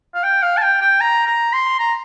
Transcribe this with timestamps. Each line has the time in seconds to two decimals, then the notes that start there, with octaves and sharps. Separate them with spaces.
0.14 F5
0.23 G5
0.42 F5
0.57 A5
0.62 G5
0.81 G5
1.01 A#5
1.27 A#5
1.53 C6
1.79 A#5